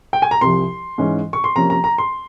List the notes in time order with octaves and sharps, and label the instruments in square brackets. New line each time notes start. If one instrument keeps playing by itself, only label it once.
[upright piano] G5
G#5
A#5
C2 C3 F3 C6
G#2 E3 G#3 C#4
C#6
C6
C3 F3 A#3 C#4 A#5
A#5
A#5
C6